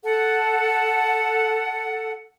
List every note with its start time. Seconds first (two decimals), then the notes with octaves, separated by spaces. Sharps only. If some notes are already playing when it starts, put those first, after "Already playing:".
0.04 A4 F#5